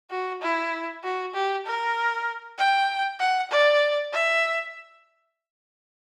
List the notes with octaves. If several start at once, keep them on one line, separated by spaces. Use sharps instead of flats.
F#4
E4
F#4
G4
A#4
G5
F#5
D5
E5